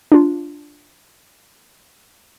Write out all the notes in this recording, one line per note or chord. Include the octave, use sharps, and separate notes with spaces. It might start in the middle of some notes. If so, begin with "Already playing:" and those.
D4 F4